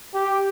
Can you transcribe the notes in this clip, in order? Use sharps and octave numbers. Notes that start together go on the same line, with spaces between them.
G4